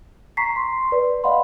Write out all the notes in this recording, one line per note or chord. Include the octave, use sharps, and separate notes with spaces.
A#5 C#6 B6 C7
C6
B4 D5
D5 D#5 F5 F#5 B5 C6